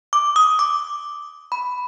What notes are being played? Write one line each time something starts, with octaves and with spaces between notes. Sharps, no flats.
D6
D#6
D6
B5